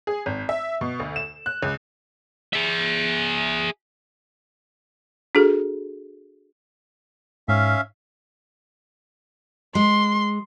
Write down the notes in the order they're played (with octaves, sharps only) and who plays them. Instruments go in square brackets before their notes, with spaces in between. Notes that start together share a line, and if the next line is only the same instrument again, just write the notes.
[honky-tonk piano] G#4
G#1
E5
B2
D2
E7
F#6
C#2
[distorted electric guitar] G#4 E5
[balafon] D4 F#4 G#4 A4
[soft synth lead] G#2 [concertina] C#4 E5 F5
[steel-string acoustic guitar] G#3 [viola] C6